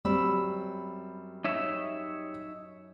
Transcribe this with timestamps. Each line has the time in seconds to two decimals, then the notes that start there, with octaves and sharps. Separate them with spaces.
0.05 F#2 G3 C4 B5 E6
1.44 D#4 C#5 E5